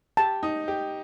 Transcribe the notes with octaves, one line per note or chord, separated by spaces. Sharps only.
G4 A5
D#4
G4